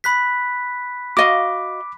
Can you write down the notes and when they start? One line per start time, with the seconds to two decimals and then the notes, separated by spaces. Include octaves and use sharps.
0.04 B5 F#6 B6
1.17 F#4 D#5 F5 D6